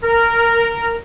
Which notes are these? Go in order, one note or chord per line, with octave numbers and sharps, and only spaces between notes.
A#4